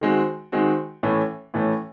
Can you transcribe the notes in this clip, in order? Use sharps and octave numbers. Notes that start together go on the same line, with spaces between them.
D#3 G#3 C4 F#4
D#3 G#3 C4 F#4
A2 E3 A3 C#4
A2 E3 A3 C#4